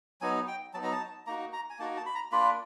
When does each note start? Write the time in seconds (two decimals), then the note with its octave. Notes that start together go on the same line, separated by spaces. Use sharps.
0.21 F#3 B3 D#4 G#5
0.48 G5
0.74 F#3 B3 D#4 A5
0.83 A#5
0.92 A5
1.27 A#3 D#4 F#4 A#5
1.53 A#5
1.70 G#5
1.79 A#3 D#4 F#4 A5
1.97 A5
2.06 B5
2.15 A#5
2.32 A#3 D4 F4 B5